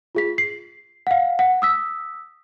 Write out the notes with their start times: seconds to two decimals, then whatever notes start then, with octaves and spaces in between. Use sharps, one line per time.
0.15 F4 G#4 B6
0.38 C7
1.07 F5 F#5
1.39 F#5
1.62 D#6 E6 B6